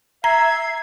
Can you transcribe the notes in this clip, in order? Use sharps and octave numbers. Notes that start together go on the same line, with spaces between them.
E5 A#5 G#6 C7